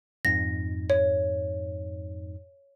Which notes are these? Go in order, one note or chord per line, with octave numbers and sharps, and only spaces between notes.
F2 G#2 D#4 A#6
C#5